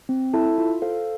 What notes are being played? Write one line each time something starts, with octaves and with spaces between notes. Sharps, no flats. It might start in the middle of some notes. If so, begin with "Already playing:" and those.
C4
E4 A4 E5 A5
F4
A4 C5 F5